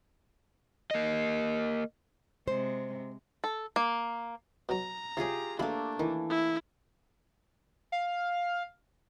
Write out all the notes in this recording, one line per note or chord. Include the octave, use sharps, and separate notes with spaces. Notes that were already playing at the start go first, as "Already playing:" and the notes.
A#3 D#5
C3 G#3 C5
A4
A#3
B2 F#3 A#5
C3 C#4 F4 G4 G#4
B2 E3 A3 A#3 D4 B5
D#3 E3
E4
F5